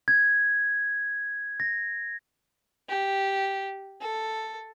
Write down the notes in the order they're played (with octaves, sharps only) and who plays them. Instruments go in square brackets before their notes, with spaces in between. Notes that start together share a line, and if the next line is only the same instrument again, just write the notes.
[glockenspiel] G#6
A#6
[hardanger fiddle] G4
A4